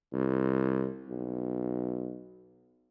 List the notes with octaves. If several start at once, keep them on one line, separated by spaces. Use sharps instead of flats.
C2
B1